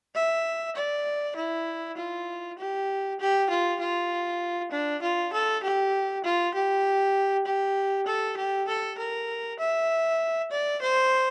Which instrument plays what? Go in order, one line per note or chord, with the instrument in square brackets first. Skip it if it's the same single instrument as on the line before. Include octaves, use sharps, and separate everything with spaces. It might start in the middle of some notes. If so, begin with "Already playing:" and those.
[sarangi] E5
D5
E4
F4
G4
G4
F4
F4
D4
F4
A4
G4
F4
G4
G4
A4
G4
A4
A#4
E5
D5
C5